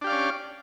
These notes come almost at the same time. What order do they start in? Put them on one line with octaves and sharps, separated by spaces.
D4 G4 F5 D5 C#4